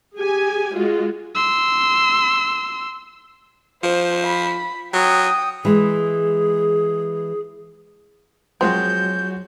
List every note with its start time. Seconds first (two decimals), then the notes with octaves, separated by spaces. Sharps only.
0.18 G4 G#4 G#5
0.74 G#3 F4 F#4
1.35 C6 E6
3.83 F3 C5
4.26 B5
4.94 F#3 G5 D#6
5.65 E3 G#3 G#4
8.61 F3 F#3 G#3 C4 F#4 G6